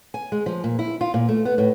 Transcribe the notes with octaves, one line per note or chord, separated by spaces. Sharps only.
G#5
G#3
F3
A#2
E4
F4
A#2
A3
B3
A2